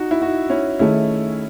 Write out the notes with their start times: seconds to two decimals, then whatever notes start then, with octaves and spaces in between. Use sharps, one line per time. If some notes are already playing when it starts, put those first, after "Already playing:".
Already playing: D#4 F#4
0.11 E4
0.20 D#4 F#4
0.50 C#4 E4
0.79 D#3 A3 C#4 D#4 E4 G#4